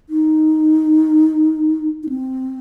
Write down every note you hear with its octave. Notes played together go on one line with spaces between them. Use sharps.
D#4
D#4
C4